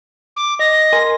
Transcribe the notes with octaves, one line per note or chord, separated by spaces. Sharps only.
D6
D#5 A#6
A#4 G#5 C6